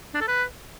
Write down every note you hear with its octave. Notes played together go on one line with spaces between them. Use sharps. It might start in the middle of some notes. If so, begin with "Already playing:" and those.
D4
A4
B4